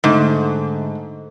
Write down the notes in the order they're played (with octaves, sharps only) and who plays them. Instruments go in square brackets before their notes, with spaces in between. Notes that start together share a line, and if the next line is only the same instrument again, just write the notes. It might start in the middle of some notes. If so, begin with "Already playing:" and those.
[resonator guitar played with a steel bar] G#2 [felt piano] D3 A3